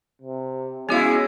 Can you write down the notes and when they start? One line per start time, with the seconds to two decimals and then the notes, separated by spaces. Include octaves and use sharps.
0.22 C3
0.89 G#3 B3 C#4 E4 F#4 F5